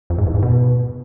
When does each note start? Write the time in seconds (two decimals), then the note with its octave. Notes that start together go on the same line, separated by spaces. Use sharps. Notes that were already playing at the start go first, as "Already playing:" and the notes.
0.10 F2
0.18 G#2
0.26 E2
0.34 G#2
0.43 B2